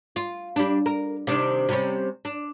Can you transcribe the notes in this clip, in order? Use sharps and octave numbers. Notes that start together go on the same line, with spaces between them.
F4
G3 D4
A#4
C3 D#3 D4
C3 G3 C#4
D4